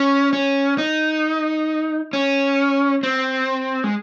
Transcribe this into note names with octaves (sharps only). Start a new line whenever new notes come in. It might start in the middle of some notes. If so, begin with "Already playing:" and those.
Already playing: C#4
C#4
D#4
C#4
C4
G#3